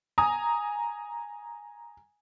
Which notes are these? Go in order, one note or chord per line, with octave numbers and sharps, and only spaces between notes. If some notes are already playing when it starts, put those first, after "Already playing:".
G#5 A#5 D#6